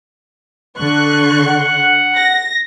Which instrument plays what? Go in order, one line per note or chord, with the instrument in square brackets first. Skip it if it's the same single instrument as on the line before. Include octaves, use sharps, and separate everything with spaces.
[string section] D3 C#6 F#6
[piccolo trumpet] F#5
[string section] A#6